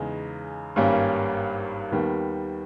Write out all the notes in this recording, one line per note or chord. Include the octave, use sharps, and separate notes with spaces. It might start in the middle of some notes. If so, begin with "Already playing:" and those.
Already playing: E2 C#3 G#3 D#4
G#1 G2 G3 A#3 C#4
D#2 D#3 G3 B3